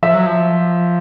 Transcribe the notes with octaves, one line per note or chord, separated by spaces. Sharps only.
F3 E5
F#3
F3